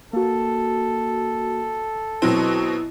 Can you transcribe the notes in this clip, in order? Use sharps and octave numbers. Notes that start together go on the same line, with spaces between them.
A#3 F#4 A4
B2 F#3 C4 E4